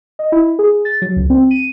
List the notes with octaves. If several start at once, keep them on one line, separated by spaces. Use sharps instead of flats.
D#5
E4
G#4
A6
F#3
C#2
C4
D#7